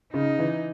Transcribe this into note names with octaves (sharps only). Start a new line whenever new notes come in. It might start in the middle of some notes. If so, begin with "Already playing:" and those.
C#3 D#4
E3